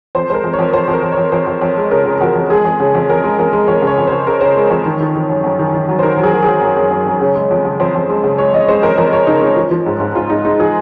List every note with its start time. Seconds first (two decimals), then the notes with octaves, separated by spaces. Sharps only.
0.15 F2 C5
0.29 G#3 C5
0.34 A#4
0.44 F2
0.53 C#5
0.59 F2
0.73 F2 C5
0.88 F2
0.93 A#4
1.03 F2
1.12 C#5
1.18 F2
1.32 F2 C5
1.47 F2
1.62 F2
1.77 G#3
1.91 C#3 A#4
2.06 C#3
2.21 F2 F#4
2.35 F2
2.50 G#3 G#4
2.65 F2
2.80 C#3
2.95 F2
3.09 F2 A#4
3.24 G#3
3.39 F2 A#4
3.53 G#3
3.68 F2 C#5
3.82 C#3
3.87 C#5
3.98 F2
4.07 C#3 C5
4.27 C#3 A#4
4.41 C#3 C5
4.57 G#3
4.70 F2 C#5
4.86 D#3
5.00 D#3
5.15 D#3
5.29 F#2
5.44 F#2
5.59 D#3
5.74 D#3
5.88 F#3
5.99 C5
6.03 D#3 A#4
6.18 F#3
6.23 G#4
6.33 F#3
6.42 G#4
6.48 F#3
6.62 F#2
6.77 F#2
6.91 F#2
7.07 F#2
7.21 C#3
7.35 G#3
7.51 F2
7.65 C#3
7.80 F2 C5
7.95 F2
8.09 G#3
8.24 C#3
8.38 G#3 C#5
8.53 F2 D#5
8.68 G#3 C5
8.82 F2 A#4
8.98 F2 A#4
9.12 F2 C#5
9.27 C#3 D#4
9.41 G#3 C#4
9.57 F3
9.71 F3
9.86 G#2
10.00 G#2
10.15 G#2 F4
10.30 G#2 D#4
10.45 G#3 D#4
10.59 F3 G#4